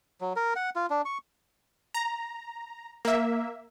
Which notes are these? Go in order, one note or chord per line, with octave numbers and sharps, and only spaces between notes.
F#3
A#4
F#5
F4
D4
C#6
A#5
A#3 E5